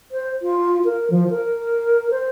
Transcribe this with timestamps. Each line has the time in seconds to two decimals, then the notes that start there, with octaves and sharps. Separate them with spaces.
0.12 C5
0.42 F4
0.85 A#4
1.10 F3
1.30 A#4
2.10 C5